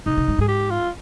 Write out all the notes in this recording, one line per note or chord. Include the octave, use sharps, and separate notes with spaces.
C3 D#4
C3
G#2
G#2 G#4
G4
F4